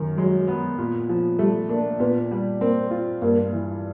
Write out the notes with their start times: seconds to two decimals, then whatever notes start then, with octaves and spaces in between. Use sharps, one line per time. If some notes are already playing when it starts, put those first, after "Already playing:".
Already playing: F#2 D#3
0.17 F#3 G#3
0.48 B3
0.78 A#2
1.09 F3
1.39 G3 A3
1.69 A#3 D4
2.00 A#2 B3
2.31 G3
2.61 A#3 C4
2.91 F4
3.22 G2 A#3
3.53 E3